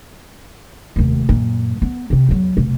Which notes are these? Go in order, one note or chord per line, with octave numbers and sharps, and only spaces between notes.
F1 D#2
F#2 A#2
B3
C3 C4
E2 F#3
F1 B1